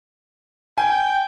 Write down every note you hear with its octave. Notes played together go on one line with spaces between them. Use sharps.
G5 G#5